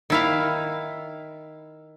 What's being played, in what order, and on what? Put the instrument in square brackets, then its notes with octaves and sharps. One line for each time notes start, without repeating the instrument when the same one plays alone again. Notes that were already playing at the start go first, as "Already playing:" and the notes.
[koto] D#3 E4 F5